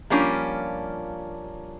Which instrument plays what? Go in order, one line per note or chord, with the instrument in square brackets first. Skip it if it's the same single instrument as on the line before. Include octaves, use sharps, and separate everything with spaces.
[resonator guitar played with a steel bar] F3 G3 A#3 C#4 D4 F4